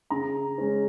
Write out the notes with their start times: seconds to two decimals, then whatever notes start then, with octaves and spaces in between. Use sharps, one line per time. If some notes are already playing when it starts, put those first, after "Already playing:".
0.10 C#3 A#5
0.58 G#3 C#4